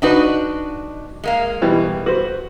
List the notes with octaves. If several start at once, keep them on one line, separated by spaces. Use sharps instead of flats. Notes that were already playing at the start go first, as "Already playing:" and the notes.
D4 D#4 F#4 B4 D#5
G#3 A#3 F5
B2 E3 G3
F#4 B4 C5